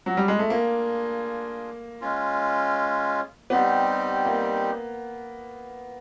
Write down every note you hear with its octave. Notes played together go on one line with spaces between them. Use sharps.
F#3
G3
G#3
A3
A#3 D4 F4 G#4
G#3 C#4 F4
G3 B3 C4 D#4 G4
A#3